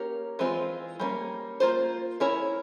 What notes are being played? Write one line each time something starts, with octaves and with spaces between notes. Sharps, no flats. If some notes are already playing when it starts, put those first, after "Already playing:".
Already playing: A#3 C#4 G4 A#4 C#5
E3 G#3 C4 F4
G3 A#3 C#4
A#3 F4 C5
C#4 E4 A#4 C#5